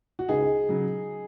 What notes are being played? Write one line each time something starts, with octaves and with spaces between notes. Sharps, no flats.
F#4
C#2 D#4 G#4
C#3 F#3